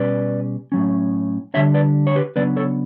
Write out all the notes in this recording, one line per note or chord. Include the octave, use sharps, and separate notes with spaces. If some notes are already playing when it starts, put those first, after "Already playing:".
Already playing: B2 G3 C#4 B4 D5
A2 F#3 C#4
D3 G3 D4 C#5 E5
B4 D5
C#5
G4 B4
C#3 F#3 B3 D4 B4 D5
A4 C#5